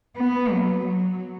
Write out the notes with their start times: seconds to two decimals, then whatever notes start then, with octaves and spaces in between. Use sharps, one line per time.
0.17 B3
0.51 F#3
0.86 F#3